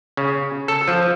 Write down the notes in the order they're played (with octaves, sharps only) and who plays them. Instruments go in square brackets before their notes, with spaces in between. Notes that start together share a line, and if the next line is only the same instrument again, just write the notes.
[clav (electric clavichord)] C#3
A4
F3